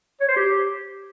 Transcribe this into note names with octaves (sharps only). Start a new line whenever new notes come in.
C#5
C5
G4